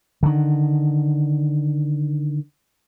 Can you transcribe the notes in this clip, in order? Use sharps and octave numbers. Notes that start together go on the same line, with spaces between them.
D3 D#3